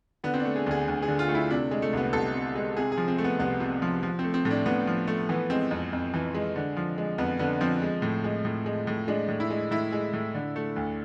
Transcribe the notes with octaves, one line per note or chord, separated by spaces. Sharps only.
D3 B3
C4
D4
A3
G#4
D2 G#4
D2
G#4
D3
F4
A3
E4
C3 D4
G#3
A3
C2 B3
C2 A4
C3
G#3
C3 G#4
G#4
F3
C4
A3
B3
C2 B3
C3
F3
F3
A3 C4
C4
A2
D4
A2 B3
F3
A3
E3 B3
G#3 C4
F2
F2
E3
G#3
D3
F3
G#3
F2 B3
D3 B3
F3 C4
G#3
A2
G#3
A2
G#3
A2
G#3 D4
A2
E4
G#3
A2 E4
G#3
A2
D3
A3
D2